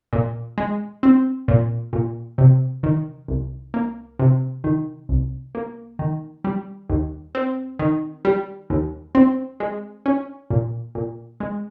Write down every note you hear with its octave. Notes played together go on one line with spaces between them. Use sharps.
A#2
G#3
C4
A#2
A#2
C3
D#3
C2
A#3
C3
D#3
C2
A#3
D#3
G3
D#2
C4
D#3
G3
D#2
C4
G#3
C#4
A#2
A#2
G#3